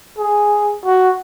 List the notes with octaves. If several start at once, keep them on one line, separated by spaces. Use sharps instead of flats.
G#4
F#4